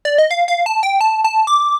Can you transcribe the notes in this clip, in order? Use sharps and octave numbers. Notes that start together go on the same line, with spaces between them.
D5
D#5
F5
F5
A5
G5
A5
A5
D6